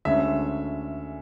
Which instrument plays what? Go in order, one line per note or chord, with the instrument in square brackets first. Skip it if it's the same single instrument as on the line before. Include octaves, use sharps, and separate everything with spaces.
[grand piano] D2 D3 G#3 C#4 E5